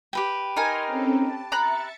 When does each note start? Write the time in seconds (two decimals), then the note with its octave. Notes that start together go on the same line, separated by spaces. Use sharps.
0.13 G4 B4 G5
0.57 D#4 A#4 G#5 C6 F6
0.87 C4 C#4 A4
1.19 A5
1.52 E5 A#5 B5 F#6 A6 C#7